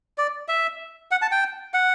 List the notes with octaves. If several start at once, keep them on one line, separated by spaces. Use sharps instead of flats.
D5
E5
F#5
A5
G5
F#5